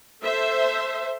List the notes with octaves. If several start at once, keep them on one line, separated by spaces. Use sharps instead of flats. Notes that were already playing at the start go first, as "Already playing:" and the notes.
A4 C5 E5